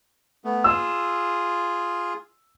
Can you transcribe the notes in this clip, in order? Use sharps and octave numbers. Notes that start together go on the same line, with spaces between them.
A3 B3
F4 G#4 E6